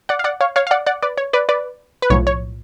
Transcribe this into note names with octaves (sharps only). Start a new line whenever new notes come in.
D5 F#5
F5
D5 F#5
C#5 F5
C#5 F5
F5
D5 F#5
D5 F#5
B4 D5
C#5
B4 D5
B4 D5
B4
B1 A2 F3 C#5
C#5